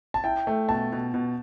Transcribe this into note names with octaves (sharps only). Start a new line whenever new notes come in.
A5
E4 G5
A3
B2 A5
B2
B2